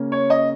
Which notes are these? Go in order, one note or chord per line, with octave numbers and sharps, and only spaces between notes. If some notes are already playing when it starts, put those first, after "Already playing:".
Already playing: C#3 A#3 C#4
C#5
D#5